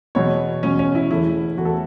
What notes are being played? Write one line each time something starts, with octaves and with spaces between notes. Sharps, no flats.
E2 B2 F#3 C#5
E2 B2 F#3 C#4
C#4
E4
E1 E2 E3 A3 E4
E1 E2 E3 A3 F#4
A4